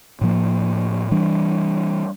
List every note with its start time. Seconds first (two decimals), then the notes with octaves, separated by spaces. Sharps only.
0.21 A2 F3 A#3
1.11 E3 G3 D4